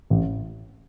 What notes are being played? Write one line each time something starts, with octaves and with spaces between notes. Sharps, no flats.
A1